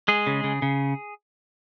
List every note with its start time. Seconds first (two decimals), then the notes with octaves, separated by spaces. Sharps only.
0.08 G#3 G#4
0.27 C#3
0.44 C#3
0.62 C#3